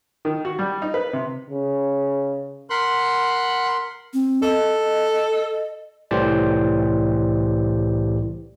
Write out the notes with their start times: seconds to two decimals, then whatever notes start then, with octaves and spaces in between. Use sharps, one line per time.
0.25 D#3
0.45 F#4
0.59 G3
0.82 D#4
0.94 B4
1.13 C3
1.50 C#3
2.70 A#4 F#5 B5 C6 F#6
4.14 C4
4.43 A4 D#5
6.11 C2 A2 E3 G4 C5 D5